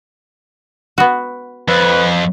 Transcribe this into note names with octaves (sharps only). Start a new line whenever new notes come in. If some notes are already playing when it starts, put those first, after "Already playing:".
B3 F#4
F2 B4